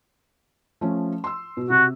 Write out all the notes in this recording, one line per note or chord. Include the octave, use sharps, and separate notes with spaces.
F3 A3 C#4
C6 E6
B2
C3 F#4